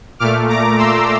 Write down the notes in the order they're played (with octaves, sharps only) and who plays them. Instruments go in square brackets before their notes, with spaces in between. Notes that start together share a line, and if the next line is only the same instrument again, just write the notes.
[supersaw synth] A#2 A3 D6 F6
A#5 D6
C6 E6